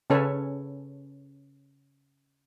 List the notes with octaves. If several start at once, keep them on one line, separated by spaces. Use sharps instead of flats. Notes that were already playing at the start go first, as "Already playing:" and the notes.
C#3 C#4 A4 B4 C#5